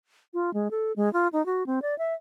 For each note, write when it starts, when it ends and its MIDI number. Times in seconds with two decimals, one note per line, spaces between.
0.34 0.53 65
0.54 0.68 56
0.71 0.92 69
0.96 1.11 56
1.13 1.28 65
1.33 1.45 63
1.46 1.66 66
1.66 1.79 60
1.82 1.97 74
1.98 2.14 76